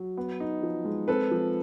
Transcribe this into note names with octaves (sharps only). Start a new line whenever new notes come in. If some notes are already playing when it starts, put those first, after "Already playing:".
Already playing: F#3
B3
D#4
F3
G#3
C4 A4 B4
F3